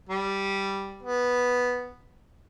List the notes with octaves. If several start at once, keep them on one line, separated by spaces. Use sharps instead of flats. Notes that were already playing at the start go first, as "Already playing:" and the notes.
G3
B3